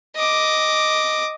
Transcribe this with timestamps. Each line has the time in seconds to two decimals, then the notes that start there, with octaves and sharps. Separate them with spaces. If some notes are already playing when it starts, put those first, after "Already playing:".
0.16 D#5 D6